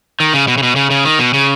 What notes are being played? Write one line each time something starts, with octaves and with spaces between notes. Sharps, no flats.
D#3
C#3
B2
C#3
B2
C#3
C#3
D#3
B2
C#3